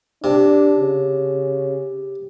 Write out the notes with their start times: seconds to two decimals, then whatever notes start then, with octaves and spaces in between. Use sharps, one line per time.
0.24 C3 D4
0.78 C#3